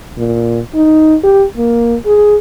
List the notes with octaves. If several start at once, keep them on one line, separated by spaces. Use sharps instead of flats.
A#2
D#4
G4
A#3
G#4